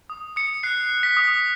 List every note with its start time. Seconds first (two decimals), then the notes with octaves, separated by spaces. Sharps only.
0.10 D#6
0.36 D#6 C#7
0.63 F#6 C7
0.90 F#6
1.03 B6
1.17 D#6